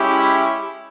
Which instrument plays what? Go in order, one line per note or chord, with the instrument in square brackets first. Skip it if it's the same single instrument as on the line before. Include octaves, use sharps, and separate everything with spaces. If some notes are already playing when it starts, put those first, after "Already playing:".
Already playing: [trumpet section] G#3 C#4 E4 G4